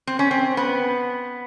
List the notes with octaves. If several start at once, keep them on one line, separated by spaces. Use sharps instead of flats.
C4
C#4
C4
B3